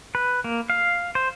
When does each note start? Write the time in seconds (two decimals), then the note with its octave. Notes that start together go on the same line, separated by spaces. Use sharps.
0.15 B4
0.44 A#3
0.70 F5
1.15 C5